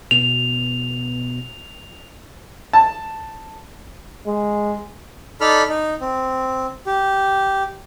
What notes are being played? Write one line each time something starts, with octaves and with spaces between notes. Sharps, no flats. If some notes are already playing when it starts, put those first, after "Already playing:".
B2 F7
A5
G#3
D#4 A4 D5 B5 F6
D#4
C4
G4